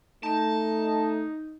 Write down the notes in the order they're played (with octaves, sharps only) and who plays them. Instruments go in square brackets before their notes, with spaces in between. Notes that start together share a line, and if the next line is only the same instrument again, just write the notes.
[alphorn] A3 [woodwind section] D#4 [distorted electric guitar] A5